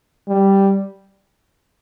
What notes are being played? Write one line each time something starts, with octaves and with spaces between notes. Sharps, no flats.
G3